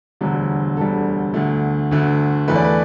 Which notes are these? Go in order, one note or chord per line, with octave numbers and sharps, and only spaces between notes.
E1 D2 D3 G3
E1 D2 D3 G3 A4
D2 D3 A3
D2 D3 A3
E2 E3 A3 B4
D5
B4